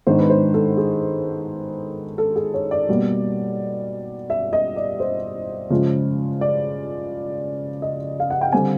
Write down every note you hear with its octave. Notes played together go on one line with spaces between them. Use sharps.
G#2 D#3 G#3 B3 D4 C5
B4
C5
A4
G#4
A4
G#4
C#5
D5
B2 G3 A#3
E5
D#5
D5
C5
C#3 F3 G#3
D5
D#5
F5
F#5
G5
D3 G3 C4 G#5